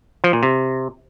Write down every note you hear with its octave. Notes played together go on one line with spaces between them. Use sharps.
F3
A#2
C3